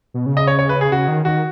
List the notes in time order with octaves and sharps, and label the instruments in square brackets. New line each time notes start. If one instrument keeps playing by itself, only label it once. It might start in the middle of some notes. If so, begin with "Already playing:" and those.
[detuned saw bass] B2
C#3
[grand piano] D#5
C#5
C#5
B4
G#4
[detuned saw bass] C#3 [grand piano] F#4
[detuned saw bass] D#3
[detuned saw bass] D#3 [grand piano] F#4